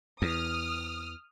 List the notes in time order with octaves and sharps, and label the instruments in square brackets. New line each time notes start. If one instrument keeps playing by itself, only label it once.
[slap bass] E2 [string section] D#6 F6